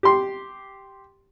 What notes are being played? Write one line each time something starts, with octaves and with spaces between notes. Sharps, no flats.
G4 C6